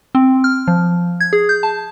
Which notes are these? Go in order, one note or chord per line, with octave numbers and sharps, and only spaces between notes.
C4
F6
F3
G#6
G#4
G6
A5